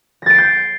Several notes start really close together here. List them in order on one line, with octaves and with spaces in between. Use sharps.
A#6 A6 D7 C7 G6